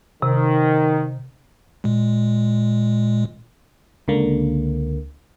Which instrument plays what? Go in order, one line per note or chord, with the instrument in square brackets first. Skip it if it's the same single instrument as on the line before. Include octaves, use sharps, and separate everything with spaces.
[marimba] C3 [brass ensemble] D#3
[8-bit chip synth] A#2 G#3
[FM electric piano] C#2 D3 A#3